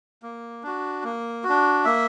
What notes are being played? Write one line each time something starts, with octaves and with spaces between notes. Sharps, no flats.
A#3
D4 F#4
A#3
F#4
D4
A#3 E5